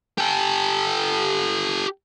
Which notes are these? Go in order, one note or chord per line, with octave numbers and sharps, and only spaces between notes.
G4 A4